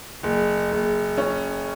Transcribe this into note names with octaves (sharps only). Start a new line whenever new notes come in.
F#1
F#1
C#4